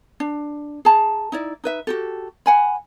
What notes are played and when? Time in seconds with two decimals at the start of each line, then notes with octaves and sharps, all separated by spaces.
0.20 D4
0.85 G#4 A5 A#5
1.32 D#4 E4 D5
1.64 D#4 B4 E5
1.87 F#4 G4 A4
2.46 F#5 G#5 B5